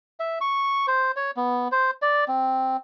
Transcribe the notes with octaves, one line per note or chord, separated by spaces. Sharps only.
E5
C#6
C5
C#5
B3
C5
D5
C4